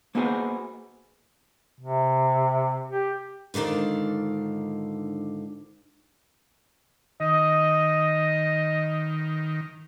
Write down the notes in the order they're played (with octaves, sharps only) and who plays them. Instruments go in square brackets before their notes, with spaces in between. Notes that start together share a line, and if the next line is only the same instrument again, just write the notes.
[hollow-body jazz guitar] A#3 B3 D#4 F#4 G#4 C5
[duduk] C3
G4
[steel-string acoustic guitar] G#2 D3 D#3 D4 F4
[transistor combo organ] D#3 [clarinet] D#5